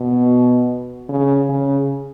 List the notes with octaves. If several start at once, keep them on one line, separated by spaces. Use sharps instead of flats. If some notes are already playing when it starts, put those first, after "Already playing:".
Already playing: B2
C#3
C#3